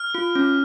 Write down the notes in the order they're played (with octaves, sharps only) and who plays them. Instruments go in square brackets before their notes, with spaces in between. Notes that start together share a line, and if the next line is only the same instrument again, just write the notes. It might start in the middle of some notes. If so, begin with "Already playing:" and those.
Already playing: [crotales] F6
[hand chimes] F4
C#4